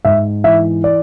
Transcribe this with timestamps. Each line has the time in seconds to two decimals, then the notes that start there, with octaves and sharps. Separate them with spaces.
0.05 G#2 E5
0.44 E3 E5
0.84 D5